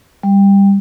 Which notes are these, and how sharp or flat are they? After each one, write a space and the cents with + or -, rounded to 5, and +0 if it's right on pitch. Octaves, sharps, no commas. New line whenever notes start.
G3 +15